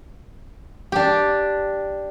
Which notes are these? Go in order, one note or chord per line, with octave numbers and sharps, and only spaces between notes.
D4 G4